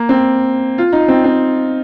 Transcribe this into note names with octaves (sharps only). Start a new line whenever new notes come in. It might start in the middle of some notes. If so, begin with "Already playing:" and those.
Already playing: A#3
C4
F4
D#4
C4
C4